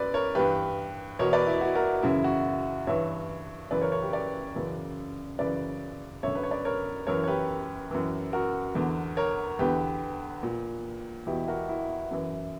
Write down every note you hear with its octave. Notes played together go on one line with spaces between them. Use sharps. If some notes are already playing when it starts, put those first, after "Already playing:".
Already playing: F#2 B4 D5
A#4 C#5
G2 E3 G4 B4
E2 B2 A#4 C#5
B4 D5
E4
F#4
F#4 A#4
F#2 C#3 E3 E4
F#4
G2 E3 C#5 E5
F#2 C#3 E3 B4 D5
A#4 C#5
A#4 C#5
G4 B4
B4 D5
F#2 C#3 E3
F#2 C#3 E3 B4 D5
F#2 D3 C#5 E5
B4
C#5
B4 D5
A#4 C#5
F#2 E3 A#4 C#5
C#5
G4 B4
F#2 E3
F#4 A#4
E2 D3
A#4 C#5
E2 D3 G4 B4
A#2
E2 B2 E4 G4
F#4 A#4
E4
F#2 E3